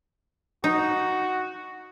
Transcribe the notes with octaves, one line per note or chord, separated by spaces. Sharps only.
D#4 F#4